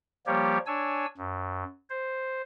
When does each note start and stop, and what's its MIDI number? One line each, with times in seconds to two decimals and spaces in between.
0.27 0.58 53
0.27 0.58 55
0.27 0.58 58
0.27 0.58 67
0.27 0.58 73
0.66 1.06 62
0.66 1.06 73
0.66 1.06 80
0.66 1.06 88
1.17 1.64 42
1.90 2.42 72